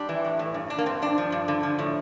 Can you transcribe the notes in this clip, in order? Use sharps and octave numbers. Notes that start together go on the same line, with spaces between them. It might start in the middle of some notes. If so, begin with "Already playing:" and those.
Already playing: G3 D4
E3
A2
A2
G2
G2 D4
A#3
G2 C4
G2 D4
F3
G2
D3
F3
A2